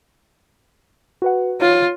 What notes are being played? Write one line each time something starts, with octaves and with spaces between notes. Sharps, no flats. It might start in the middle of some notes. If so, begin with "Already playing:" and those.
F#4 B4 F#5
F4 C#5